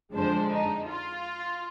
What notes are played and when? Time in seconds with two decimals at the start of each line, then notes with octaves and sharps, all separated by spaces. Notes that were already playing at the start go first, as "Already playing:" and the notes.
0.13 F2 D3 F3 G#3 D4 C5
0.50 D#4
0.87 F4